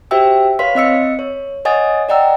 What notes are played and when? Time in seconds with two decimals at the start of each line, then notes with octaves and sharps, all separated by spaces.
0.11 F#4 G4 C5 E5 G5 E6
0.59 B4 C#5 F5 C6 B6
0.75 C4 D#5 E6 C#7
1.19 C#5
1.65 C#5 D#5 F#5 G#5 D#6 A6
2.09 D5 D#5 F#5 G5 A#5 E6